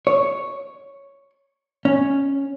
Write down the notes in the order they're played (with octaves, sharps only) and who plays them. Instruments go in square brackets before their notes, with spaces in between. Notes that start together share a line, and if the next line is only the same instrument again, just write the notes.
[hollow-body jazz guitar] C#5
C#4